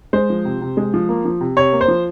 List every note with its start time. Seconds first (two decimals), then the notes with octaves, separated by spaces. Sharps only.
0.13 G#3 C5
0.30 F3
0.45 C3
0.61 C3
0.77 G#3
0.94 F3
1.09 A#3
1.25 F3
1.41 C3
1.56 C3 C#5
1.72 A#3
1.81 C5
1.88 F3